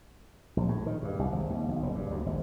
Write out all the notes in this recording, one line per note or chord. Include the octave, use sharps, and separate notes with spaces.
A#1
A2
D#3
G2
C2
G#1
D#2
B1
F#1
G2
D2
G#1